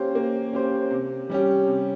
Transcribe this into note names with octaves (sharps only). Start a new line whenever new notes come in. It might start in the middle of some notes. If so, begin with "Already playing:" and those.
Already playing: A#3 C#4 G4 C5
A#3
C#4 G4 C5
C3
G3 C#4 G4
C3